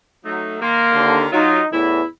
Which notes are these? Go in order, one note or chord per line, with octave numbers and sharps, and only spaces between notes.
F#3 A3 D#4
D#3 A#3 C6
D#2 D3
F#3 D#4 F4
E2 A2 E3 E4